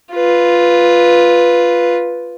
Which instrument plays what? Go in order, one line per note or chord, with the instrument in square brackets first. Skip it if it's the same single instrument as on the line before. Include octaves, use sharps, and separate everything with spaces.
[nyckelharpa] F4 B4